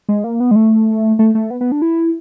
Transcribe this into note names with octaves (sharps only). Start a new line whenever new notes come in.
G#3
A#3
B3
G#3
A3
A3
A3
B3
B3
D4
E4